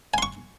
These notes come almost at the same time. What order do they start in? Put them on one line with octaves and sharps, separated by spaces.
G#5 C6 C#6